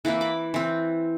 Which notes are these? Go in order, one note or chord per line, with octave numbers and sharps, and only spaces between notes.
E3 A#3 C4 E4
B5 D6
E3 C4